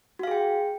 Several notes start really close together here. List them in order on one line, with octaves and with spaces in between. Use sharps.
F#4 F5 G#4 G5